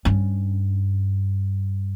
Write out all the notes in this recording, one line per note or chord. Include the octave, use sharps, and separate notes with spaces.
G2 C#4